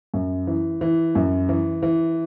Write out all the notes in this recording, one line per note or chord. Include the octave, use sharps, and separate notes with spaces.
F#2
E3
E3
F#2
E3
E3